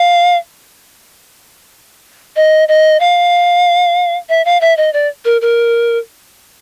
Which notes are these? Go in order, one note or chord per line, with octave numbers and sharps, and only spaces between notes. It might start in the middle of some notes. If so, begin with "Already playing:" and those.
Already playing: F5
D#5
D#5
F5
E5
F5
E5
D#5
D5
A#4
A#4